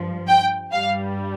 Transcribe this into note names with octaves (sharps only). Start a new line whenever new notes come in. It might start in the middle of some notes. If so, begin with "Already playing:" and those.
Already playing: G2 F3
G5
G2 G3 F5